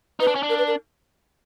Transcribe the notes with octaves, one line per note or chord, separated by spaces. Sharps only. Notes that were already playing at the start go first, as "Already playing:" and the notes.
D#4 B4
D4
C#4
D4
A#4
B4
A#4